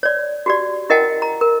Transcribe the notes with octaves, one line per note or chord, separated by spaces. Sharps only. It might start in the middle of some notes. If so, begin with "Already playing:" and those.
C#5 D5
F#4 G4 D5
E4 A#4 D#5 F#5 G5 A5
A#5
A#4